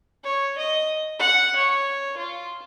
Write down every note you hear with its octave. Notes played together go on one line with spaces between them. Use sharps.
C#5
D#5
F#5
C#5
F4